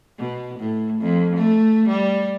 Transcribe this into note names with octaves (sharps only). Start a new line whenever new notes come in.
B2
A2
F2
A3
G3